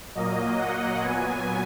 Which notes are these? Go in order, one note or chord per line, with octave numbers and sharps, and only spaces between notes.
A#2 F#3 A#3 D#5
F#5
A#2 F#3 B3 G#5